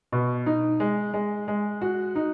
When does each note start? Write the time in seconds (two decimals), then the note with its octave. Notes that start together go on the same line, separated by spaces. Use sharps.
0.12 B2
0.46 D#4
0.80 G#3
1.14 G#3
1.48 G#3
1.82 F#4
2.15 D#4